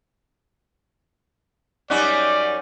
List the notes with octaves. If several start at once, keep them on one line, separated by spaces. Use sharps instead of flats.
F#2 G3 C#4 D#4 F#4 D5